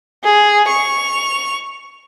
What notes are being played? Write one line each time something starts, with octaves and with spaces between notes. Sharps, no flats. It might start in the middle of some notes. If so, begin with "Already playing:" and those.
G#4
C#6 F7